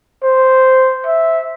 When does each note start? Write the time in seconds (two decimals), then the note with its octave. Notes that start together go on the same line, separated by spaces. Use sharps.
0.23 C5
1.06 E5